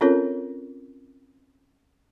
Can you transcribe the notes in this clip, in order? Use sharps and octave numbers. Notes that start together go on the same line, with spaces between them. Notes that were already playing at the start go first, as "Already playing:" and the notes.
C4 C#4 F4 A4 A#4 C#5